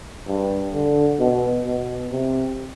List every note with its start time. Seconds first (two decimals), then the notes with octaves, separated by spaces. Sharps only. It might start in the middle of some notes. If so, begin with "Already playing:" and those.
0.28 G2
0.74 D3
1.20 B2
1.66 B2
2.11 C3